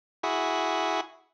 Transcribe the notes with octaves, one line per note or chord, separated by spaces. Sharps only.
E4 F#4 G#4